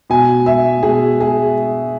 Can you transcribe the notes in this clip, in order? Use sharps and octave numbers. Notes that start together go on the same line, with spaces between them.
B2 G#5
E5
B2 G#4
G#4